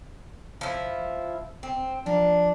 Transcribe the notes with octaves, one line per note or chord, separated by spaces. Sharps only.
F3 E4
C4
F3 A#3 D4